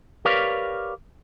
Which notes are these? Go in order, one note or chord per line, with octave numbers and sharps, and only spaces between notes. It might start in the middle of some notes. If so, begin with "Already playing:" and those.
G4 A#4 B4 C#5 D5 F5